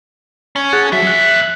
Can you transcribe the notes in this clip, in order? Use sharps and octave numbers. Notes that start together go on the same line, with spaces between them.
C#4
G#4 F#5 A5
F2 F#3 E5
F#6